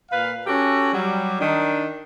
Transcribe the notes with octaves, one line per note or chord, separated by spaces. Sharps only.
A#2 B4 F5
C#4 F#4 G4 A4
F#3 G3
D#3 D4